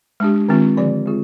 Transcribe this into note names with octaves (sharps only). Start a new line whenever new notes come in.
G#3 D4 G4
D#3 G#3 C4 F4
D3 F3 C4 G4 D5
G#3 C4 F4 G#4